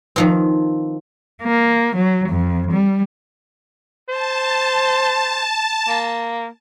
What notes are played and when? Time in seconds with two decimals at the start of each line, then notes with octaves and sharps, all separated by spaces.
0.16 D#3 F3 C4
1.42 A#3
1.96 F#3
2.29 F2
2.72 G3
4.09 C5 A5
5.88 A#3